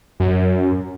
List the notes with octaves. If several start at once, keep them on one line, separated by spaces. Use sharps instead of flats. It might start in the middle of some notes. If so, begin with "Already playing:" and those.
F#2